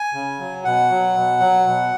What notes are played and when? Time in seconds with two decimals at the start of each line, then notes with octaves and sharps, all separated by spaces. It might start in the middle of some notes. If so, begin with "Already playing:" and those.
Already playing: G#5
0.14 C#3
0.39 F#3
0.64 B2 F#5
0.90 F#3
1.15 B2
1.40 F#3
1.66 B2